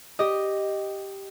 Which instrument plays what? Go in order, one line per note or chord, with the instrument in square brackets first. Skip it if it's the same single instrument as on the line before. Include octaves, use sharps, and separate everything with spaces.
[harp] G4 D#5